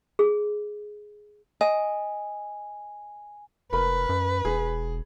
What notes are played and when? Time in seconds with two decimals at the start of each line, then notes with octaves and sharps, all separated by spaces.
0.19 G#4
1.61 D#5 G#5
3.73 F1 A#4 B4 B5
4.09 F#2
4.45 E1 G#4